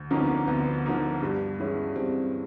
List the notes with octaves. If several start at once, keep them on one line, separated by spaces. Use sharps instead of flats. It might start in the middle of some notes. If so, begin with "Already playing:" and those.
Already playing: D2
D3 F3 A#3 C#4 D#4
B3
C4
D2 B3
D3 F3 A#3 D#4
G2
E3 G#3 C#4 E4
G2 C4